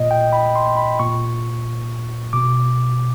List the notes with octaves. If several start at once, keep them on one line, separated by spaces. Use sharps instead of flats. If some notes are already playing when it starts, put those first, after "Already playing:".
Already playing: A#2 D#5
G5
B5
C6
B5
A#2 C#6
B2 D6